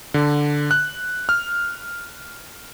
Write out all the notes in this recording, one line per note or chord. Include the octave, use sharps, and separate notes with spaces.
D3
F#6
F6